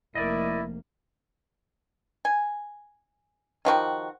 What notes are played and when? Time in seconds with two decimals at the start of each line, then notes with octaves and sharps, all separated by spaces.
0.15 F1 A#3 E4 A#4 D5 D#5
2.25 G#5
3.65 D#3 F3 F#4 G4